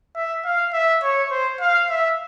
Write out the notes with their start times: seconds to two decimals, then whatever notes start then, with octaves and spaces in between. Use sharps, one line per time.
0.15 E5
0.44 F5
0.73 E5
1.03 C#5
1.31 C5
1.61 F5
1.90 E5